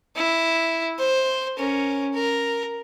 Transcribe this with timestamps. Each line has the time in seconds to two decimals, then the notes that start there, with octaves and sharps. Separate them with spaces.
0.16 E4
0.99 C5
1.58 C#4 A#4
2.14 A#4